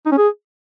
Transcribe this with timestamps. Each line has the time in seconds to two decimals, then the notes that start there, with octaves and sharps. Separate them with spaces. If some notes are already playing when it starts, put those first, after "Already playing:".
0.06 D#4
0.12 C#4
0.17 G#4